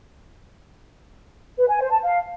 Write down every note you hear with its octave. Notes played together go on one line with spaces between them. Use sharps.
B4
G#5
C5
A5
F5